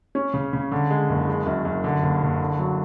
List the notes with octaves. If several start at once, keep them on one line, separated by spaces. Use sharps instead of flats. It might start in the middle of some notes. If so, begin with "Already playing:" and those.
C#4
C#3
C#3
D3
G#3
F#1
G#3
F#2
F#2
D3
F#1
F#1
D3
F#3